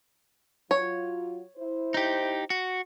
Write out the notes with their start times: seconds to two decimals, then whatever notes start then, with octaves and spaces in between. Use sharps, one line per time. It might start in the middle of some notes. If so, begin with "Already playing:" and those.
0.71 F#3 F4 C#5
1.57 E4 C5
1.94 D#4 G4
2.50 F#4